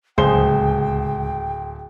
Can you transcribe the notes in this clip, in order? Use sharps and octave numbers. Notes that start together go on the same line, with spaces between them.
D1 C#2 G#4 C5 G5 G7